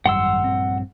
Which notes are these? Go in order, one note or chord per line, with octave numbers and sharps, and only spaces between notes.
G#1 F#2 G3 F#5 C6 E6
A#1 G2 C4